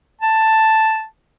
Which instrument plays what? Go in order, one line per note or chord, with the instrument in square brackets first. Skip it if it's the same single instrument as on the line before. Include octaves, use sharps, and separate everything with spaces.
[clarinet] A5